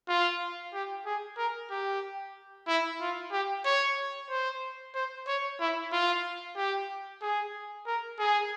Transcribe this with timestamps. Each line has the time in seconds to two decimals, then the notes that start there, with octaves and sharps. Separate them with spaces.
0.09 F4
0.74 G4
1.06 G#4
1.38 A#4
1.71 G4
2.67 E4
3.01 F4
3.32 G4
3.65 C#5
4.30 C5
4.95 C5
5.27 C#5
5.60 E4
5.92 F4
6.56 G4
7.22 G#4
7.87 A#4
8.19 G#4